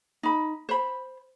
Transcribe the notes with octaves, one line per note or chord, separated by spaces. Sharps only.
D#4 B5
C5 B5